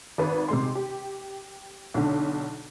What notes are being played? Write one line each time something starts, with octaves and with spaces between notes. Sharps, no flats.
G#1 B4
C3 G#3 C6
G4
B1 D3